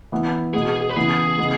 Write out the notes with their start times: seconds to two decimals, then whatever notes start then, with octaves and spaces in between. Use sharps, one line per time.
0.12 E3 B3 E4
0.54 B2 G#3 B3 G#4
0.68 G#4
0.82 G#4
0.89 B4
0.96 C#3 E3 B3 E4 G#4
1.38 C#3 G#3 B3